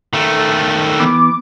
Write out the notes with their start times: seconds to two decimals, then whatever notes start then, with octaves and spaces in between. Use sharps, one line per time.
0.13 D#3 A3
0.37 A4
1.00 E3 B3 D6